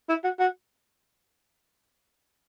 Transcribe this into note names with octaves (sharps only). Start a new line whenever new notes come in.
E4
F#4
F#4